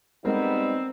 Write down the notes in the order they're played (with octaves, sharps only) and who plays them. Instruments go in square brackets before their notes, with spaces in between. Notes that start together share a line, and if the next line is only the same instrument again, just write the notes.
[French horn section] G3 B3 [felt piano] G#3 A#4 [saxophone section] C4 [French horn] D#4